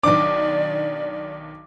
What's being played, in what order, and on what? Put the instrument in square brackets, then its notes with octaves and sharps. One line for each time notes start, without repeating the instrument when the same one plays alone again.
[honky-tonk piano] B1 D#3 D4 [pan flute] D5 [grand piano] D6